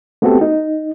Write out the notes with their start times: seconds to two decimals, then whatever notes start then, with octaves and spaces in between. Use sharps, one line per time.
0.22 A3 B3 C4 F#4 G4 A4
0.41 D#4